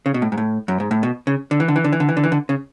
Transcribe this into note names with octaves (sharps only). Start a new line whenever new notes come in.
C#3
B2
A2
G#2
A2
F#2
G#2
A2
B2
C#3
D3
E3
D3
E3
D3
E3
D3
E3
D3
E3
D3
C#3